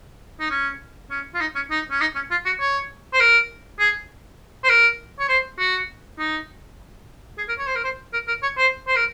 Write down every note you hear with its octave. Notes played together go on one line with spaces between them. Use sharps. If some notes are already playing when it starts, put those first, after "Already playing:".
D#4
C#4
C#4
F4
D#4
C#4
D#4
C#4
D#4
C#4
F4
F#4
C#5
C5
A#4
G#4
C5
A#4
C#5
C5
F#4
D#4
G#4
A#4
C#5
C5
A#4
C5
A#4
A#4
C#5
C5
C5
A#4